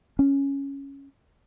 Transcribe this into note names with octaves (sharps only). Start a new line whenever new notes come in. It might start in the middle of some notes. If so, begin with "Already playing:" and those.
C#4